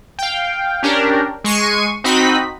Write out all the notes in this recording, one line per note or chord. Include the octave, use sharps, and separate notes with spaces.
F5 G5
C#4 D4 G4 A#4
G#3 C#6 C7 D#7
C4 D#4 F#4 D#5 B5 B6